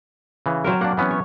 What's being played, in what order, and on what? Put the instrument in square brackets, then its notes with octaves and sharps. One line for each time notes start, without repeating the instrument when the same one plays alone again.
[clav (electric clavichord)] C#3 E3
[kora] F#3 C4 A#4
[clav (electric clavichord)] A#3 D4 [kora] F#5
[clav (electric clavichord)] E3 B3 C#4
[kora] C#5